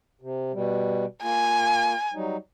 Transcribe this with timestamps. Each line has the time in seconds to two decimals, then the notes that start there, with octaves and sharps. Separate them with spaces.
0.21 C3
0.53 B2 G3
1.23 A#3 F4 G#5
2.14 F#3 G3 D#4